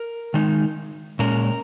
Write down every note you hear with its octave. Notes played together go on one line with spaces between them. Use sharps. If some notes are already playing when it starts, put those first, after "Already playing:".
Already playing: A#4
D#3 G#3 D#4
A#2 G#3 C#4 A#4